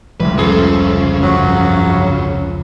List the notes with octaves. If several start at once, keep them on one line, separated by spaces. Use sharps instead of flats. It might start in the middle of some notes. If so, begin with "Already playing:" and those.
F1 C#2 F3 G3 A3 B4
F2 C#3 A4
G2 F3 F#3